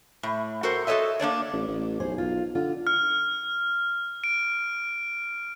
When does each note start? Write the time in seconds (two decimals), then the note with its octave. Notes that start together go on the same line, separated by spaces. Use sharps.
0.23 A2
0.63 F#4 A4 A#4 C5
0.87 F#4 A4 C5 C#5 D#5 E5
1.19 A#3 D4 C#5 D5
1.53 A1
1.68 A1
2.00 B1 G#4 C5
2.18 F4
2.55 D3 F4
2.87 F6
4.24 D7